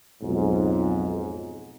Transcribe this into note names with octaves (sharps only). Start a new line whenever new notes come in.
B1 F2 G#2